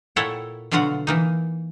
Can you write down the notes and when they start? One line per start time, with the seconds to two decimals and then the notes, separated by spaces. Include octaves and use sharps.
0.16 A#2 E4 A4 C#5 F#5 G5
0.71 B2 D3 F#3 F4 F#4 F#5
1.07 E3 A#3 D#4